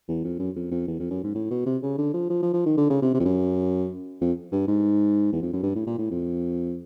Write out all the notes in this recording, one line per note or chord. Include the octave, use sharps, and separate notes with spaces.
E2
F2
F#2
F2
F2
E2
F2
F#2
G#2
A2
B2
C3
C#3
D3
F3
F3
F3
F3
D#3
D3
C#3
C3
C3
F2
F#2
F2
G2
G#2
E2
F2
F#2
G2
A2
A#2
A2
F2